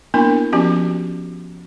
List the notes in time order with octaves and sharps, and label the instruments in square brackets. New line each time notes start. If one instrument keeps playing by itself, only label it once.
[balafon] A#3 B3 D4 E4 A#4
F3 B3 C#4 F#4 G4